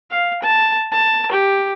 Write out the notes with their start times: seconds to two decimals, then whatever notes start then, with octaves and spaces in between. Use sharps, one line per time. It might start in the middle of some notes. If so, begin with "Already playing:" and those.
0.11 F5
0.43 A5
0.92 A5
1.31 G4